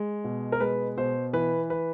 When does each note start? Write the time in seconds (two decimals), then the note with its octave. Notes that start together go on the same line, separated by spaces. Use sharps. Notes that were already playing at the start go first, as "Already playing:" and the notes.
Already playing: G#3
0.24 B2
0.52 A#4
0.60 G#3 B4
0.97 B2 C5
1.33 E3 B4
1.70 B4